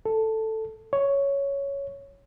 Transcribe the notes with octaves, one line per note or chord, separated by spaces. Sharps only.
A4
C#5